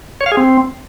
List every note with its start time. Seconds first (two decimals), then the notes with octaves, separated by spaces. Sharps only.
0.21 C#5
0.26 F5
0.32 G#4
0.37 C4